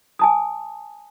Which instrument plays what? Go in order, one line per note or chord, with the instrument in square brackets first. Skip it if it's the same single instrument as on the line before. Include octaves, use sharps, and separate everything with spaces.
[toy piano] G#5 A5 D#6